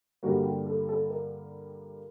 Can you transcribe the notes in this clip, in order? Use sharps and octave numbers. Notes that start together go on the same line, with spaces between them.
G2 D3 G3 A#3 F#4
G4
A4
A4
A#4